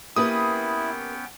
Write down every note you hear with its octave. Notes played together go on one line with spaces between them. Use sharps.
A#3 B3 C#4 E4 G4 B4 G5 D#6